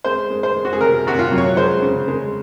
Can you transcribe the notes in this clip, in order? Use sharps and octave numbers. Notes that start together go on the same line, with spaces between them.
G#3 C5
G#3
C5
G#3
F#4
G#4
C3 A#4
C3 F#4
F4
F#3
C#5
G#3 C5
C#3
G#3